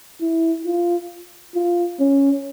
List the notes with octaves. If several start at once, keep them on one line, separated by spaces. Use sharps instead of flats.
E4
F4
F4
C#4